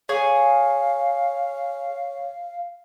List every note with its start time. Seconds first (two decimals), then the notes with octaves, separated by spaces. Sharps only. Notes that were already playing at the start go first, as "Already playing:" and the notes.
0.09 G#4 C#5 F5